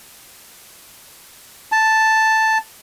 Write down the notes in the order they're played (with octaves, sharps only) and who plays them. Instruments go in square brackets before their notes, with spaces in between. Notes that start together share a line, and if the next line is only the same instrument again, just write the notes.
[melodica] A5